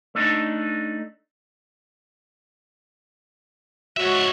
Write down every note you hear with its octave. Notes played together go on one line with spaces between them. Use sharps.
A3 D4 D#4
G#2 F#4 C#5 E5